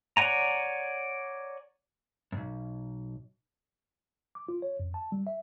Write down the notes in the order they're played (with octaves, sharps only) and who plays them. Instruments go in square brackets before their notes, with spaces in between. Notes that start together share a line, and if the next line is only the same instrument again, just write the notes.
[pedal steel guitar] C#5 D5 F#5 G#5 A#5
[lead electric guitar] B1 F#2
[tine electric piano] D6
F4
C#5
F2
A5
G3
E5